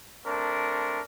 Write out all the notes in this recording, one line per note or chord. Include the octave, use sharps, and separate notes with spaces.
A3 C4 D4 A#4